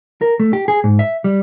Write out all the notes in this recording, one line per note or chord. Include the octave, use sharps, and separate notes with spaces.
A#4
A3
G4
G#4
G#2
E5
G3